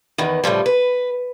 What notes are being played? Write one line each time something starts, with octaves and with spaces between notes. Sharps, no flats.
E2 D#3 E3
A2 C#3 F3 G3
B4